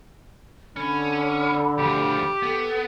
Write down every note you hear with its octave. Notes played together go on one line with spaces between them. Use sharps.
D3 C#4 B5
D2 F3 G4
B3 A4